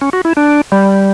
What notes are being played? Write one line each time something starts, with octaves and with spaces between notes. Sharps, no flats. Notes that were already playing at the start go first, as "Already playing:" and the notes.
C#4
F#4
E4
D4
G3